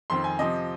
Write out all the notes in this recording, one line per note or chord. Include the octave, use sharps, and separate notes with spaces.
F2 D#3 C4 C6
G#5
C3 F3 C4 D#5